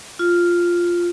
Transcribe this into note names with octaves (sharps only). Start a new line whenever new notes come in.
F4